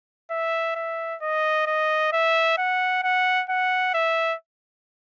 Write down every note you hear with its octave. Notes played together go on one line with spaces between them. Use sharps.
E5
E5
D#5
D#5
E5
F#5
F#5
F#5
E5